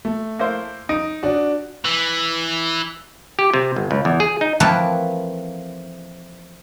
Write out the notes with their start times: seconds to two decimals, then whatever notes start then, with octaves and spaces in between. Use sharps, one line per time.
0.05 A3
0.39 A#3 E4 C5
0.89 D#4 D7
1.23 D4 F#4
1.85 E3
3.39 G4
3.54 C3
3.76 G1
3.91 C#2
4.05 E2
4.20 G#4
4.41 D#4
4.60 E3 F3 A3 A#3 C4 B4